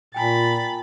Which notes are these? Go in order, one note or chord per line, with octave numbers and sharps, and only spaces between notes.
A#2 G5 G#5 A#5 B5 A6